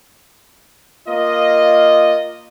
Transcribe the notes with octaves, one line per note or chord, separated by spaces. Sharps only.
A#3 F4 D#5